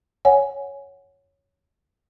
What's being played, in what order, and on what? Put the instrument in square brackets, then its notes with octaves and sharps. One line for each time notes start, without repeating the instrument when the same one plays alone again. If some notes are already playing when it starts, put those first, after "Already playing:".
[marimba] C#5 F#5 G#5